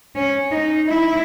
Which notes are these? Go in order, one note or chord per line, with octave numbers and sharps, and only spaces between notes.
C#4
D#4
E4